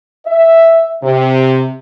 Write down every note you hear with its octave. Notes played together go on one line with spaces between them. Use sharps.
E5
C3